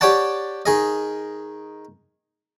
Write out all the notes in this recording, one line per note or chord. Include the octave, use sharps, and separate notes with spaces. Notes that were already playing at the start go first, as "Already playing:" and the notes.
G4 C#5 D5 F#5 A5
D#3 G#4 D#5